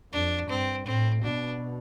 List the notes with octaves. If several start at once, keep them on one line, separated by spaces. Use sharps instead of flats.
F2 D4
G2 C4
A2 C4
B2 D4